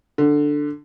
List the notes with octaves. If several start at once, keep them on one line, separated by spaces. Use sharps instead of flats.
D3